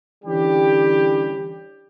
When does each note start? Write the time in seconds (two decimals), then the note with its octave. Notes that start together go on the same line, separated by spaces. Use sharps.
0.25 D3 E3 G3 C#4 G4